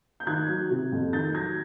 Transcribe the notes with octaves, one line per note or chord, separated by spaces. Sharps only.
G6
D#3 F#6 G#6
F#3
C3
F2
D#3 G6 A6
F#3 G#6 A#6